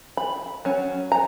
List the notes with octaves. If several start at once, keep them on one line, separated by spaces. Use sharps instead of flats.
B5
F#3 C#4
A#5